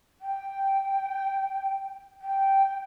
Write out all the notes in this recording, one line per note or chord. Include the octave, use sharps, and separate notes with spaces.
G5
G5